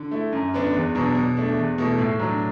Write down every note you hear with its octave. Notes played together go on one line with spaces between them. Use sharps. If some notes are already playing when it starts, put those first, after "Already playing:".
Already playing: D3
A3 E4
F#2
D3 B3 D4
E2
B2 F#3 D4
B2
A3 D4
E2
B2 A3 E4
A2
F#3 D4